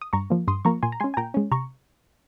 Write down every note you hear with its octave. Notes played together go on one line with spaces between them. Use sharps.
D#6
G2 A#5 C#6
F3 A#3
G2 C6 D#6
F3 A#3 A#5 C#6
A#2 G#5 C6
A#5
G#3 C#4 G#5 C6
G#5
A#2 G5 A#5
G#3 C#4
C3 A#5 C#6